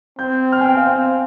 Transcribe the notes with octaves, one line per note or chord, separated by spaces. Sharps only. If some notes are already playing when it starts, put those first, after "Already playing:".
C4 G6
F6
G#5
G5
F5
C4